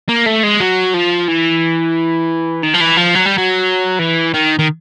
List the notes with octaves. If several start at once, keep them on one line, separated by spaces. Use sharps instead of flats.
A#3
A3
G#3
F#3
F3
E3
D#3
F3
E3
F3
F#3
G3
F#3
E3
D#3
D#3